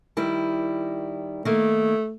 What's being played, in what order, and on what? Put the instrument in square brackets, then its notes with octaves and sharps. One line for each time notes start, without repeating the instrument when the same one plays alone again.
[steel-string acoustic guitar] D#3 G3 E4
[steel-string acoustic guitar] D#3 A#3 [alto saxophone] A3